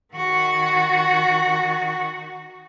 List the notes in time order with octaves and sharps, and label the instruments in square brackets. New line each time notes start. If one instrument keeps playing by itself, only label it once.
[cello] D#3 F#4